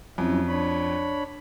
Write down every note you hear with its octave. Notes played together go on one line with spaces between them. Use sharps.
F2 F#3 C#4 E4
D4 C#5 B5